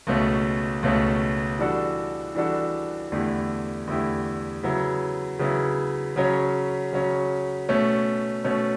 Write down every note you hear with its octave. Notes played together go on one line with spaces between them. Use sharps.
C#2 B2 A3 C#4
C#2 B2 A3 C#4
E3 G3 D4 F#4 A4
E3 G3 D4 F#4 A4
E2 D3 A3 E4 G4
E2 D3 A3 E4 G4
C#3 F#3 B3 E4
C#3 F#3 B3 E4
C#3 F#3 C#4
C#3 F#3 C#4
B2 A3 C#4
B2 A3 C#4